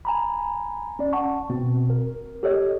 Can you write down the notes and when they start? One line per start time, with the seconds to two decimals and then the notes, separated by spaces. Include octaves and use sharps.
0.05 G#5 A#5 B5
0.99 C#4 D5
1.13 F#5 A5 C#6
1.50 B2 C4
1.90 A#4
2.43 G4 A4 C#5 D#5